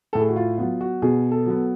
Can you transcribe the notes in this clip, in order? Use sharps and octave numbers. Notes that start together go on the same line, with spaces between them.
A2 A4
G#4
F#4
F4
F#3 B3 F4
F#4
B2 G#4
A4
F#3 B3